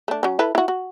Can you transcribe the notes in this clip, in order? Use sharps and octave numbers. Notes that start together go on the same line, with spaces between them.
A3 D4
F#3 C#4
E4 A4 B4
E4 F#4
F#4